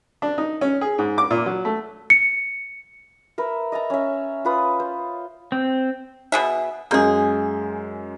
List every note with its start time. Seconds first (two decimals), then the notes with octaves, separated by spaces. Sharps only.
0.22 D4
0.38 D#4
0.61 C#4
0.81 G#4
0.98 G#2
1.18 D6
1.31 A#2
1.46 F#3
1.65 A3
2.10 C#7
3.38 A#4 B4 E5
3.72 D#5 E5 A5 A#5
3.90 C#4 E5
4.45 F4 B4 D#6
4.80 C5
5.52 C4
6.32 B2 G#4 E5
6.91 F#2 G#3 A#3 G#4 G6